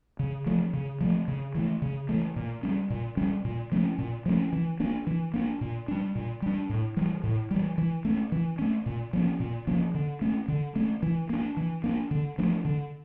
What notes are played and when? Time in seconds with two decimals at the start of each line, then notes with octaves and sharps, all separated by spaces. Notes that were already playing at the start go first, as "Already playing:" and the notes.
0.19 C#3
0.46 F3 A3
0.73 C#3
1.01 F3 A3
1.28 C#3
1.55 E3 A3
1.82 C#3
2.09 E3 A3
2.36 A#2
2.63 G3 C#4
2.90 A#2
3.17 G3 C#4
3.45 A#2
3.72 F3 A3 C#4
3.98 A#2
4.26 F3 A3 C#4
4.53 E3
4.80 A#3 D4
5.07 E3
5.34 A#3 D4
5.61 A#2
5.88 G3 D4
6.15 A#2
6.42 G3 D4
6.70 A2
6.97 E3 G3
7.24 A2
7.51 E3 G3
7.78 E3
8.05 A3 C#4
8.32 E3
8.59 A3 C#4
8.86 A#2
9.13 F3 A#3 C#4
9.40 A#2
9.67 F3 A#3 C#4
9.95 D3
10.21 A3 C#4
10.48 D3
10.76 A3 C#4
11.03 E3
11.29 A#3 D4
11.57 E3
11.84 A#3 D4
12.11 D3
12.38 F3 A3 D4
12.65 D3